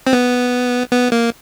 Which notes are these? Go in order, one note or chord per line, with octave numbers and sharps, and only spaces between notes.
C4
B3
B3
A#3